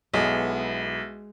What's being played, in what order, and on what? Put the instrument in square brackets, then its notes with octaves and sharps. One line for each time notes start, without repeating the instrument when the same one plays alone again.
[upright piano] B1 [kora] G#3 [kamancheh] B3 E4